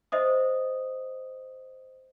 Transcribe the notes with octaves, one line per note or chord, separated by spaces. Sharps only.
C5 D#5 E5 D#6